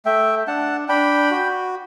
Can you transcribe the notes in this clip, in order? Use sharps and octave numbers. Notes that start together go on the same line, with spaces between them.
A3 E5 G5
D4 F#5 A5
D4 G5 B5
F#4